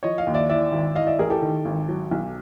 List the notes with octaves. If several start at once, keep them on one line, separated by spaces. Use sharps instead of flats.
F3 C#5 D#5
D#5 F5
D#2
D5 E5
E3 D5 E5
G#1
E3 D#5 F5
D5 E5
A1 G#4 A#4
G4 A4
D#3
G#1
F#3
B1